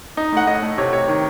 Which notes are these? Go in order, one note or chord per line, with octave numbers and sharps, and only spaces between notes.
D#4
A2 F#5
A2 D#5
A3
C3 C#5
C3 C#5
D#3